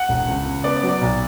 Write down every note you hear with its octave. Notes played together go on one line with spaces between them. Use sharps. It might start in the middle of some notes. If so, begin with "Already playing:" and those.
Already playing: F#5
E1
C#2
C#3
B3 D5
D5
F#3
D5
B1